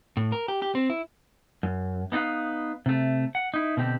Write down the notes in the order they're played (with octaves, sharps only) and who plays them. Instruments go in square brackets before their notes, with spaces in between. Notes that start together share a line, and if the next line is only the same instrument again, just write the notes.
[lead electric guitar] A2
A#4
G4
G4
C4
E4
[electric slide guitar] F#2
B3 D#4 F4 B4 F5
C3 A3
F#5
D#4 E4
B2 D3 C4 G4